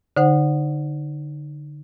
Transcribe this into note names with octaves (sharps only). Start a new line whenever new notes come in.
D3 D#4 C5 F#5